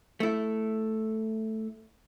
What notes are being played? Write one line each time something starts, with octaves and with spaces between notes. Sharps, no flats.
A3 E4